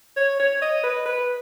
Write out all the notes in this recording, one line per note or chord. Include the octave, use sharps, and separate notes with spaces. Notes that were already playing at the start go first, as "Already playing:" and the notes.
C#5
C#5
D#5
B4
B4